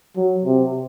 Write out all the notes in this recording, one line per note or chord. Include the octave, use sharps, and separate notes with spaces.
F#3
C3